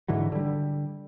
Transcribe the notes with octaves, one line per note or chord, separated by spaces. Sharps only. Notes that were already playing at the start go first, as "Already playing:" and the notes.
G#2 D3 E3 F#3
D3 G3